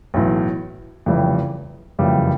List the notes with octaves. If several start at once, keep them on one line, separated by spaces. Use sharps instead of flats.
B1 A2 E3
F1 F2 C#3 E3 G3
F#1 F2 C#3 E3 G3